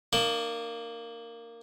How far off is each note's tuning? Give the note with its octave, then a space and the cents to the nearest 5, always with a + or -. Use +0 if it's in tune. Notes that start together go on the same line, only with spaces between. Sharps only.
A#3 -10 D4 +45 A5 -5